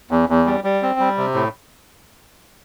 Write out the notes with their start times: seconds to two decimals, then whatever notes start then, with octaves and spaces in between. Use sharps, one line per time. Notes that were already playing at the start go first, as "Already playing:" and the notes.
0.11 E2
0.29 E2
0.46 G3
0.64 G3
0.82 C4
0.99 G3
1.17 C3
1.34 A2